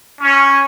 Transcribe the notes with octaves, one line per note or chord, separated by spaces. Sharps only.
C#4